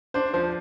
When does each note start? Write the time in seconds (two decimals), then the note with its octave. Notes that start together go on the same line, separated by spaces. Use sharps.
0.14 D4 C5
0.33 F3 C5